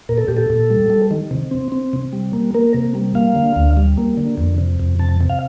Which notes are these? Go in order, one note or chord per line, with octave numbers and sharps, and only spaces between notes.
A#2 A#4
A4
A#2 G4
A4
A#2
G3
G3
D#3
C3
C4
C4
C3
G3
A#3
A#3 A#4
C3
G3
A#3 F5
D3
D2
G3
A#3
D3
F2
C3
F2
C3 A5
C3
F5